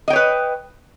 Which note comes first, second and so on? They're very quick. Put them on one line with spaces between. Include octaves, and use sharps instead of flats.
D#5 G5 C#5 B4